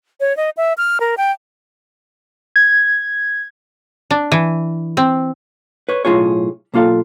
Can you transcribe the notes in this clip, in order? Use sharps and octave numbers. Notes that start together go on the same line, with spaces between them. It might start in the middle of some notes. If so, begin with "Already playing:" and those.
C#5
D#5
E5
F6
A#4
G5
G#6
D4
E3
C4
B4 C#5
B1 A2 F3 F4 G#4 C#5
B1 A#3 F4 A4 F5